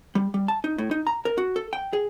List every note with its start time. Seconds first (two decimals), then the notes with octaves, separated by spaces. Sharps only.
0.15 G3
0.34 G3
0.48 A5
0.64 D#4
0.78 A2
0.91 D#4
1.07 A#5
1.25 A#4
1.38 F#4
1.56 A4
1.73 G5
1.93 G#4